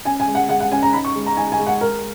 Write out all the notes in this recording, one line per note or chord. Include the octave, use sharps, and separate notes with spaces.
C#4 G#5
G#5
G#3
F#5
G#3 F#5
F#5
C#4 G#5
A#5
D#4 B5
C#6
G#3
A#5
D#4 G#5
G#5
G#3
F#5
G#3 A#4